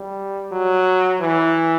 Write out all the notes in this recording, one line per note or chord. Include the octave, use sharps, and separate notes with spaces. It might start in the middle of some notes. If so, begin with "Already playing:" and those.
Already playing: G3
F#3
E3